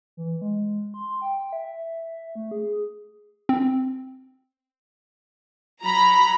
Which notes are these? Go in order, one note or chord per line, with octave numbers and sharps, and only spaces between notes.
E3
G#3
C6
G5
E5
A3
G#4
C4
F#3 A#5 B5